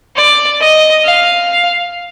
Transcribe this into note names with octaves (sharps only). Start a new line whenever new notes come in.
D5
D#5
F5